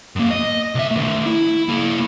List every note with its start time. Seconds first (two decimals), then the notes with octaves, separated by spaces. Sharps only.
0.16 F#2 A#3
0.31 D#5
0.75 C2 E5
0.91 D#3 A3
1.26 E4
1.68 A#3 E4